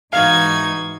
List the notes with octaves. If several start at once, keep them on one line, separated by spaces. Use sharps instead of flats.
G#2 E3 D#4 F#4 F5 G#6